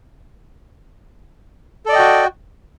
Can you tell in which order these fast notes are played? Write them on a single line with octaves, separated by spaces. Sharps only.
A4 D5 D#5 G5 F#4